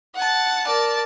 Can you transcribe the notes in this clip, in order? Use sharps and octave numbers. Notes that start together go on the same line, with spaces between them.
F#5 A5
A#4 D5 A5